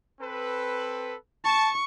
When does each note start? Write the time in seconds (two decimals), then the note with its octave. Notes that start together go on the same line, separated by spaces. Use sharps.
0.21 C4 A4 B4
1.44 A5 C#6